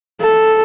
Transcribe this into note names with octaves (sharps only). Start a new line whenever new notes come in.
A4